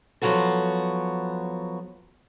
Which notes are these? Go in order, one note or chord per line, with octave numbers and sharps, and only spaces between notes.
F3 F#3 B3 F#4 A4